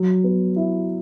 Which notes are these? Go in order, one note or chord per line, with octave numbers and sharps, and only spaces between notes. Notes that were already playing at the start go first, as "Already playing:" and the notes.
Already playing: F#3
B3
E4